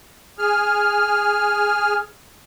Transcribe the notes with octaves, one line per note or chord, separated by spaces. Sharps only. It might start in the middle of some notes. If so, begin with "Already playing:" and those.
G#4 F6